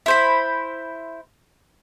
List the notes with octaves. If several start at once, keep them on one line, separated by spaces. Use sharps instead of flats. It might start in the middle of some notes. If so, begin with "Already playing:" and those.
E4 C5 B5